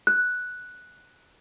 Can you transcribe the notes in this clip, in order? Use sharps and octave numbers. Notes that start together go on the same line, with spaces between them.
F#6